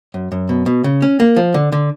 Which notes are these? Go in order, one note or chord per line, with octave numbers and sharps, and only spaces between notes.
F#2
F#2
B2
B2
C#3
C#4
A#3
F3
D3
D3